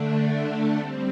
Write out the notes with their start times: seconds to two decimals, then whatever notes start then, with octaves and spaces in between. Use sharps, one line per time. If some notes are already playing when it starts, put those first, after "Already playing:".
Already playing: D3 A3 D4
0.77 G3 C4